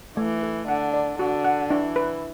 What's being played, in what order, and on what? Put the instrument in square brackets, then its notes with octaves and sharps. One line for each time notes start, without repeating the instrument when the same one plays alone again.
[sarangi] E3 [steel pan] A3
[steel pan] A4
[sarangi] D3 [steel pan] F#5
[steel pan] D5
[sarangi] D3 [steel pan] F#4
[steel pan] F#5
[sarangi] E3 [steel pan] D4
[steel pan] B4